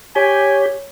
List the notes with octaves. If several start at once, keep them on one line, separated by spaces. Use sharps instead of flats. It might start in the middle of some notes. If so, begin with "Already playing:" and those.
G4 C#5 G#5